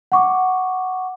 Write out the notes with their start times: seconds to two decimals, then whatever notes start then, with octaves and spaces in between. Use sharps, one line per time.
0.12 F#5 C#6 D6